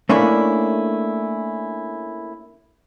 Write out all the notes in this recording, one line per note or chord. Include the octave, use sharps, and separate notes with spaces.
A3 A#3 C#4 D4 E4